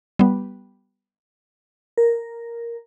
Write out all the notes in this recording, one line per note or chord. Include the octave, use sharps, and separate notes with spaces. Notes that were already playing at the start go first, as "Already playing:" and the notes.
G3 B3
A#4